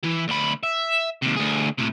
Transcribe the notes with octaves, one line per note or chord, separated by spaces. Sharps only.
E3 E4
D2 B5
E5
D#2 C3
D2 G#4
A2 C3